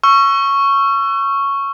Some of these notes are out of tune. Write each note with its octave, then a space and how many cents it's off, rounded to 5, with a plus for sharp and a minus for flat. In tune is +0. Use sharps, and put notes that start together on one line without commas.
C#6 +0 E6 +40